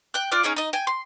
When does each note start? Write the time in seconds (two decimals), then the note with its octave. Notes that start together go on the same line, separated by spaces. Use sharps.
0.14 G5 F#6
0.31 F4 D5 F5 F#6
0.43 C#4 D#4 G#4 G5
0.56 D#4 D#5
0.73 G5 G#5
0.87 C6